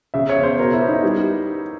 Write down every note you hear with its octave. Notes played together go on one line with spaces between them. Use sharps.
C#3 E5
C#5
E2
C5
B2 A#4
E4
B3
D#4
G3